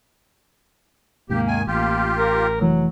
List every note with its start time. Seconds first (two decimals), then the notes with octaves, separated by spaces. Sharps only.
1.30 D#2 G#2 C3 A#3 G4
1.47 D#3 G#5
1.67 A1 A#3 F4 G4
2.17 A#4
2.61 F1 E3 F#3 A3